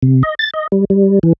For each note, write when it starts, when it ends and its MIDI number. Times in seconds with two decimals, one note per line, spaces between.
0.03 0.23 48
0.23 0.35 75
0.39 0.50 93
0.54 0.67 75
0.72 0.85 55
0.90 1.19 55
1.23 1.33 52